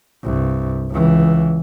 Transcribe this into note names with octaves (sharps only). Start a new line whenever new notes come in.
C2 G2
C#2 E3